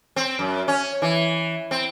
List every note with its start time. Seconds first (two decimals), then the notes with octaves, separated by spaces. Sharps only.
0.16 C4
0.39 F#2
0.68 C#4
1.02 E3
1.71 C4